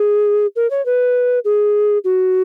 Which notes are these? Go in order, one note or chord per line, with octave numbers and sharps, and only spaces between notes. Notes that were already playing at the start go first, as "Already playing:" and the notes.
Already playing: G#4
A#4
C#5
B4
G#4
F#4